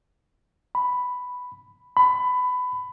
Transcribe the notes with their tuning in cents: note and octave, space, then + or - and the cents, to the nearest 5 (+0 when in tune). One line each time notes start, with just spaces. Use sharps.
B5 +5
B5 +20